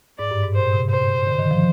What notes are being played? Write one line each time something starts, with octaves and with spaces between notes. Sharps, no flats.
G#2 D5
G2
G#2
A#2 C5
C3
C5
D3
D#3
F3